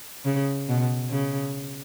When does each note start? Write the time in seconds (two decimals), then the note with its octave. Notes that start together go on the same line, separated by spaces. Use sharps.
0.25 C#3
0.68 B2
1.11 C#3